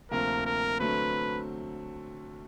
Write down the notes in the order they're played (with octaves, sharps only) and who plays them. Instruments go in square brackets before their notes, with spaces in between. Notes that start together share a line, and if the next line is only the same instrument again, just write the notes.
[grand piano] D2 C3 F3 A#3 [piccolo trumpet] A#4
[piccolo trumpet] A#4
[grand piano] D3 F#3 A3 C4 [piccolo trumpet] B4